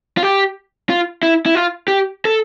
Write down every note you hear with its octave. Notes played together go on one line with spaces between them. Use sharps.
F4
G4
F4
E4
E4
F4
G4
A4